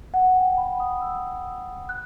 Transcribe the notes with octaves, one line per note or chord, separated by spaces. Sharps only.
F#5
G5
B5
D#6
E6
F#6